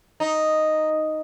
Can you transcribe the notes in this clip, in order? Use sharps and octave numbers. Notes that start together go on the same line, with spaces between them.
D#4